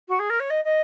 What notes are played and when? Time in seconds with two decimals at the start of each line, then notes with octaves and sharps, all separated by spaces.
0.09 F#4
0.19 G#4
0.30 A#4
0.40 C#5
0.50 D#5
0.64 D#5